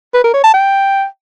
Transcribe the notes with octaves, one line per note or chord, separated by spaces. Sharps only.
B4
A#4
C#5
A5
G5